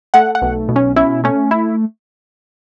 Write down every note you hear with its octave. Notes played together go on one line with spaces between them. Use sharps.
A3 F#5
F#5
B1
B2
C#4
C#4 E4
A3 C#4
E4